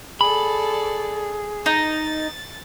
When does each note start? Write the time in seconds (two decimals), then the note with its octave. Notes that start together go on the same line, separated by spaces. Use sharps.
0.21 G#4 A4 D5 B5
1.66 D#4 A6